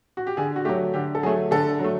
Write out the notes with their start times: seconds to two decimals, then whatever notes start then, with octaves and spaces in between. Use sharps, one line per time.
0.17 F#4
0.27 G4
0.37 D3 G#4
0.56 F#4
0.65 A3 G4
0.69 F#3
0.94 D3 G4
1.15 A4
1.23 F#3 A3 G#4
1.51 D3 A4
1.79 F#3 A3